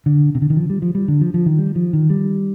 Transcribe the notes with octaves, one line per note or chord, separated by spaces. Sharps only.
D3
C3
D3
D#3
F3
G3
F3
G3
D3
F3
F3
D#3
G3
F3
D#3
G3